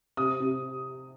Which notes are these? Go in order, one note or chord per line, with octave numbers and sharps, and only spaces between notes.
C3 D#6
C3